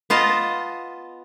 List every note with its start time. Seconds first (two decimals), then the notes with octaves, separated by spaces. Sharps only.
0.10 B3 F4 D#5 A5